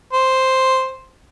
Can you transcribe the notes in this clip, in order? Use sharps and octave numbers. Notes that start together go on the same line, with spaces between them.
C5